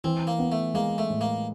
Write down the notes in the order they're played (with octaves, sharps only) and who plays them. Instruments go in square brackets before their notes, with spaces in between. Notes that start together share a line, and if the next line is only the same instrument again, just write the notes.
[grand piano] E3 [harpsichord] C4
[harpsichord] A#3
[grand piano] B3
[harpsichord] A3
[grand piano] G#3 [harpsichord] A#3
[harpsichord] A3
[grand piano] A2
[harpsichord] A#3